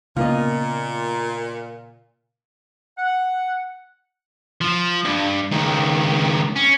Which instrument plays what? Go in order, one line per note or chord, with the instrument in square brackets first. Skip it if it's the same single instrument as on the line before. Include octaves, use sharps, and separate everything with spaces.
[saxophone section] A#2 [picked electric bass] C#3 A#3 B3 [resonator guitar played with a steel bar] F4 A#4 D#5
[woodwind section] F#5
[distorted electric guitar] F3
G2
C#2 D#3
C#4